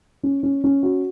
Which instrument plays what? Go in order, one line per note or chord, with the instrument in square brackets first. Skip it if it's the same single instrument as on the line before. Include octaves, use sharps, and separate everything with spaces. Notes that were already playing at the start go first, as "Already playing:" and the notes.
[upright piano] C#4
C#4
C#4
F#4